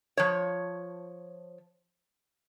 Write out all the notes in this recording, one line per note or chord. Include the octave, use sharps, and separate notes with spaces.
F3 C#5